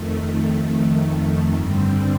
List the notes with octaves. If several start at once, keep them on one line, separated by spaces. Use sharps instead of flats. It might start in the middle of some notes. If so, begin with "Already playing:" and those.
Already playing: F2 D#3 A3
G2 D3 G3 C4